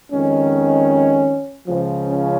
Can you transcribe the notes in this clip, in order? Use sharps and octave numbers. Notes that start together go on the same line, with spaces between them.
F2 D#3 G#3 C#4
C#2 C#3 F3
C#4